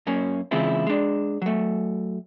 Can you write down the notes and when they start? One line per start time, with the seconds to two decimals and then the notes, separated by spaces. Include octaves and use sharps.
0.07 F#2 A#3 C#4
0.51 C#3 E3 G#3 C4 E4 F4
0.87 G#3 D4
1.42 F#3 A3